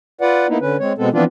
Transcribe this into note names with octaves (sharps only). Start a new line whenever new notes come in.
F4 B4 D5 F#5
A#3 B3 D#4 E4
D3 C#4 B4
G#3 C4 C#5
B2 G#3 B3 C4 A4
E3 F3 B3 C4 D4 F4